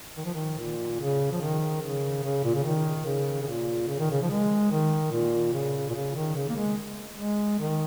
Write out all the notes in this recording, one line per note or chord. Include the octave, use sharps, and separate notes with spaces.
D#3
F3
D#3
A#2
C#3
F3
D#3
C#3
C#3
A#2
C#3
D#3
C#3
C#3
A#2
C#3
D#3
C#3
F3
G#3
D#3
A#2
C#3
A#2
C#3
D#3
C#3
A#3
G#3
G#3
D#3